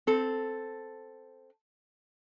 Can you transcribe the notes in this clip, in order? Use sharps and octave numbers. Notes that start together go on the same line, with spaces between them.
C4 A4